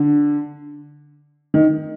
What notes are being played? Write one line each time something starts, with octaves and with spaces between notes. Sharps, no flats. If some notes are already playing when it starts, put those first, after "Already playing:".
Already playing: D3
D#3